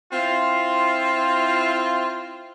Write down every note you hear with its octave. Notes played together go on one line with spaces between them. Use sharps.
C4 E4 F4